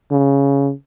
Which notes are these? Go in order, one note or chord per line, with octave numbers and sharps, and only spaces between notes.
C#3